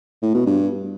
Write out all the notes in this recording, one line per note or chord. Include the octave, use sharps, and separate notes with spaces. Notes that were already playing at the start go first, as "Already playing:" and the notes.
A2
B2
G2